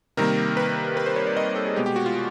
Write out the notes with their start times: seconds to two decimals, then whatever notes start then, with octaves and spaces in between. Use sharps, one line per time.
0.17 C3 D#3 G3 A#3 A#4
0.57 B4
0.97 B4
1.06 C5
1.16 C#5
1.27 D5
1.37 D#5
1.56 A4
1.66 G#4
1.76 B2 G#3 B3 G4
1.86 G4
1.96 F#4
2.06 F4